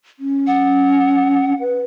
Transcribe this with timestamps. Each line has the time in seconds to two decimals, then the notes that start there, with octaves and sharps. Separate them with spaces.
0.19 C#4
0.47 F#5
1.60 B4